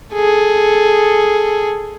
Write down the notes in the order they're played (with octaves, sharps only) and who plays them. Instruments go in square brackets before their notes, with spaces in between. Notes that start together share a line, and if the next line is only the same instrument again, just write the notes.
[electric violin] G#4 A4